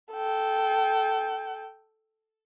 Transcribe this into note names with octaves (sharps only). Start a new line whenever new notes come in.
A4 G5